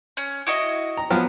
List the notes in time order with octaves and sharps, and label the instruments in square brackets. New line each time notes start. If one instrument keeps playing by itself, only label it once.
[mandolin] C#4
E4 F#4 D#5
[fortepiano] A#5
F3 F#3 B3